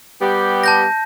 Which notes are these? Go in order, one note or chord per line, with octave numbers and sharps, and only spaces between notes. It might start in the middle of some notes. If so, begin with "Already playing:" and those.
G3 B3 G4
A5 G6 A#6